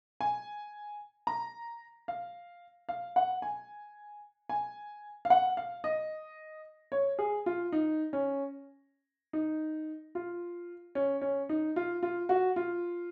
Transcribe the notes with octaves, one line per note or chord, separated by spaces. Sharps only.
G#5
A#5
F5
F5
F#5
G#5
G#5
F5
F#5
F5
D#5
C#5
G#4
F4
D#4
C#4
D#4
F4
C#4
C#4
D#4
F4
F4
F#4
F4